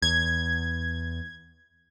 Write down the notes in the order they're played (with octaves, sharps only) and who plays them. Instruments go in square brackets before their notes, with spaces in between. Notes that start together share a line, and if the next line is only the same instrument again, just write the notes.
[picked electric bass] E2 [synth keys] G#6